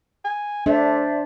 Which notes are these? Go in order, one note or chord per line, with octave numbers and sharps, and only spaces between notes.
G#5
A3 D4 C5 D5 E5